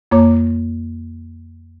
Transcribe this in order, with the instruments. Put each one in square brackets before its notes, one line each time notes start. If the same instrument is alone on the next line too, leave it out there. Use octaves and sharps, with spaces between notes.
[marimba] F2 A#3 C#5 D6